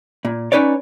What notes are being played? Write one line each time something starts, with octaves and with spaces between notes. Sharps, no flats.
A#2
C#4 D#4 B4 C#5 D5